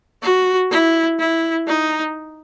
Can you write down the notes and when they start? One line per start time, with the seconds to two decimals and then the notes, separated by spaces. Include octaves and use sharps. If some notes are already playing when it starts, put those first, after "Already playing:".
0.22 F#4
0.71 E4
1.19 E4
1.67 D#4